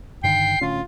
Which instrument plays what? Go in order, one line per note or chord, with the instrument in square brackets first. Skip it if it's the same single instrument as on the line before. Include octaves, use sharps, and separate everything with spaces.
[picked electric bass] G2 D3 D#3 [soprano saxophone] G5 [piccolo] C7
[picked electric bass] D1 D2 C#4 [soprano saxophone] F4